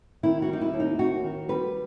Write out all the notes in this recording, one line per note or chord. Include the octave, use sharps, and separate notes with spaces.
D#3 E4
F#4
G3 D#4
E4
D#2
D#4
D#2 F#4
D#3
G3 B4